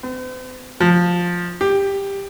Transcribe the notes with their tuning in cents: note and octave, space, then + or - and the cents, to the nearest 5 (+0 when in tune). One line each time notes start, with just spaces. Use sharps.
C4 -45
F3 +10
G4 +10